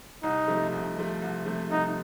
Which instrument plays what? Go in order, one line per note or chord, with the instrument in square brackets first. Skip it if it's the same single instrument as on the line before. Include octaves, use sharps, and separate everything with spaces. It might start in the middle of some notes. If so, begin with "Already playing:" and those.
[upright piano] C2 [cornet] D#4
[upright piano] C3 F3 A3
C2
C3 F3 A3
C2
C3 F3 A3
[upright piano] C2 [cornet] D#4